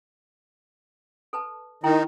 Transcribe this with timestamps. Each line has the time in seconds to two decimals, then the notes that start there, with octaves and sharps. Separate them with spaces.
1.33 A4 B4 A5
1.84 D#3 D#4 E4 G5 A#5